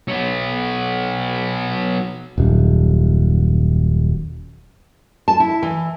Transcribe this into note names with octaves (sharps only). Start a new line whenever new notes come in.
F#3 B3
D#1 F#2
A5
E4
E3